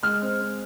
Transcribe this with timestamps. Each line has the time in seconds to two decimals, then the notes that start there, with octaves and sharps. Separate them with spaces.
0.03 G#3 F6
0.22 C4
0.40 C4